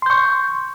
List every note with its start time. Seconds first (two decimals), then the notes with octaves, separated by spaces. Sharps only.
0.02 C6
0.06 G6
0.10 C#6